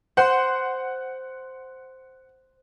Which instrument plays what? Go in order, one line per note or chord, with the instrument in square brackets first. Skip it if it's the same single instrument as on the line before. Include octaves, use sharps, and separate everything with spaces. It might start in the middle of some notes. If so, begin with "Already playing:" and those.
[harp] C5 C6 [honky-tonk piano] F#5